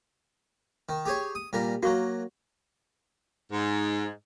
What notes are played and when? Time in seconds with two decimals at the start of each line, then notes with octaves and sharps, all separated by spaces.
0.89 D#3
1.06 G4 G#4 C#5
1.35 D#6
1.53 A#2 G3 A#4
1.83 F#3 A#3 F#4 C#6
3.52 G#2